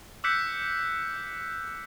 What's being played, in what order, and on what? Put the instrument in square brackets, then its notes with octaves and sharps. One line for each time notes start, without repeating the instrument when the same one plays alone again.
[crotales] D6 E6 F#6 G6 B6 C#7